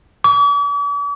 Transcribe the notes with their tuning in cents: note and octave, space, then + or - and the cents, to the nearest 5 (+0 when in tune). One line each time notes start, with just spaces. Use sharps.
D6 -45